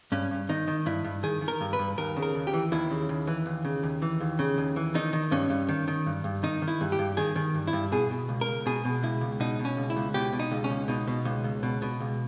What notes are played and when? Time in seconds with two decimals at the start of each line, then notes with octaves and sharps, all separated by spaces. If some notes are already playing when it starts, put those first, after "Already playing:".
0.12 G2 C#4
0.31 G2
0.49 D#3 D#4
0.68 D#3
0.86 G2 E4
1.04 G2
1.23 D#3 G#4
1.41 D#3
1.48 A#4
1.61 G2
1.73 B4
1.79 G2
1.98 D#2 A#4
2.17 C#3
2.23 A#4
2.35 D#2
2.47 G4
2.53 E3
2.72 D#2 E4
2.91 C#3
3.09 D#2
3.27 E3
3.46 D#2
3.65 C#3
3.83 D#2
4.02 E3
4.20 D#2
4.39 C#3
4.58 D#2
4.76 E3
4.95 D#3 D#4
5.13 D#3
5.31 G2 C#4
5.50 G2
5.69 D#3
5.88 D#3
6.06 G2
6.24 G2
6.43 D#3 D#4
6.62 D#3
6.68 E4
6.81 G2
6.92 G4
6.99 G2
7.17 D#3 G#4
7.35 D#3
7.54 G2
7.67 E4
7.73 G2
7.92 B2 G#4
8.10 B2
8.29 C#2
8.41 A#4
8.47 C#2
8.66 B2 G#4
8.85 B2
9.03 C#2 E4
9.21 C#2
9.40 B2 D#4
9.59 B2
9.65 C#4
9.77 C#2
9.90 E4
9.96 C#2
10.14 B2 G4
10.33 B2
10.39 D#4
10.51 C#2
10.64 C#4
10.70 C#2
10.88 B2 D#4
11.07 B2
11.25 C#2
11.44 C#2
11.63 B2
11.82 B2
12.00 C#2